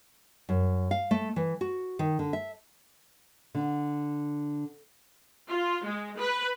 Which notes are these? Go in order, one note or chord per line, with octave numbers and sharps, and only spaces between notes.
F#2
F5
A3
E3
F#4
D#3
D3
E5
D3
F4
G#3
B4